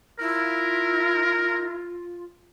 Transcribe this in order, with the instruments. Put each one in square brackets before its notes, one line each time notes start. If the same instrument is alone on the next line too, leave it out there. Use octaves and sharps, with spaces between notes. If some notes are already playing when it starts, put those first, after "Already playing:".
[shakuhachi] E4 [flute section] F4 [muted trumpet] A#4